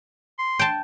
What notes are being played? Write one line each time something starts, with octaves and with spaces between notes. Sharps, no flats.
C6
G5 A5